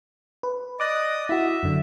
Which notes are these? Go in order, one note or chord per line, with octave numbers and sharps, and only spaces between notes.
B4
D5 D#5 D6 D#6 F#6
E4 F#4 E5
F#2 D3